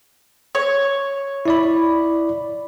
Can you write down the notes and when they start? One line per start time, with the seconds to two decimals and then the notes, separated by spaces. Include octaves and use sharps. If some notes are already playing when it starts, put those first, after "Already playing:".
0.55 C#5
1.46 E4 D5 B5